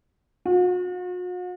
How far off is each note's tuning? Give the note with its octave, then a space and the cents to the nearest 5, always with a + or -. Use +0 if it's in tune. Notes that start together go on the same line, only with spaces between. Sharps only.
F#4 -45